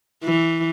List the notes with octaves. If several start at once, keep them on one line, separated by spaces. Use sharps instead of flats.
E3